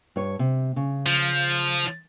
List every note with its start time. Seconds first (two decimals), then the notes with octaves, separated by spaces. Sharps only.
0.16 G2 C#5
0.39 C3
0.76 C#3
1.06 F3